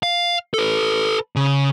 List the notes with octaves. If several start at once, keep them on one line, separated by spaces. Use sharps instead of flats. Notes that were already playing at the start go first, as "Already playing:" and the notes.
F5
A4 B4
C#3